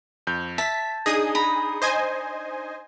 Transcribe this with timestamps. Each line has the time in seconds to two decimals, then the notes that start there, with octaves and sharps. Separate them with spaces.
0.27 F2 G6
0.58 E5 A5 B6
1.06 D4 D#4 G#4 D#6 A#6
1.35 A#5 B5
1.82 C5 D#5 G#5